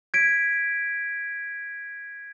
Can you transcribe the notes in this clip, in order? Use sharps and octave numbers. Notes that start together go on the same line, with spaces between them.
G#6 B6 D7